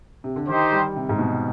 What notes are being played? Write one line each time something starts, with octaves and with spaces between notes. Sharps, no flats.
C3
D3
D#3 D#4 G4 C5
G3
C3
G#2
B2